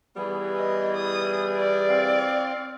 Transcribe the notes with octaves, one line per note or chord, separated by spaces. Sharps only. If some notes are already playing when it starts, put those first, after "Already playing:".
E3 G3 B3 G#4
D#5
D#6
D5
C4 F5